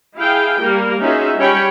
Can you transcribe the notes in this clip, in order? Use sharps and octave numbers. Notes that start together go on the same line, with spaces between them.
E4 G#4 F5 G5
G3 A#3 A#4
C#4 D#4 F4 F#4 G#4 E5
G3 C#4 C#5 G5 B5